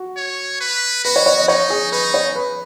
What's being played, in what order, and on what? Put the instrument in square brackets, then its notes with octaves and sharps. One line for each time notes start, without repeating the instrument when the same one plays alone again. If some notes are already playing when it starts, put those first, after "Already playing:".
Already playing: [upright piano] F#4
[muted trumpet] C#5
B4
[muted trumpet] F#4 [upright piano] B4
[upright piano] C#5
C#5
D#5
[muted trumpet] D#4 [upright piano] C#5
[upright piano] G#4
[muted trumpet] D#4 [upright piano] B4
[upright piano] C#5
B4